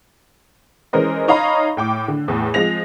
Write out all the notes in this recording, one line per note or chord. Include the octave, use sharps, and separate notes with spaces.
E3 G#3 C#4 A#4 C5 D#5
D#4 C#5 D#5 F5 A#5 B5
A2 G5 D6
D3
E2 A2
F3 G#3 C4 A#6 F7